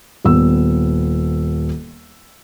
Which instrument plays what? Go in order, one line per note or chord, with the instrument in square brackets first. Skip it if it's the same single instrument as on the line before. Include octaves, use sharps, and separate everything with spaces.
[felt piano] D#1 B3 E6